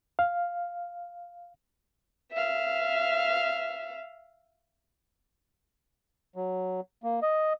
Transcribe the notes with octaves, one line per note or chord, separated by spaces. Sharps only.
F5
E5 F5
F#3
A#3
D#5